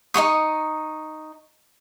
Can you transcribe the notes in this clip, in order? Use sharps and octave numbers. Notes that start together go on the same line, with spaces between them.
D#4 A4 C#6 D#6